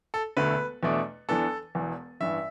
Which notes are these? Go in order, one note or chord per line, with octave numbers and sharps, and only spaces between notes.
A4
E1 D2 D3 A3 B4
E2 B2 A3 D4
E2 E3 B3 D4 A4
E1 E2 E3
A1 G2 E3 E5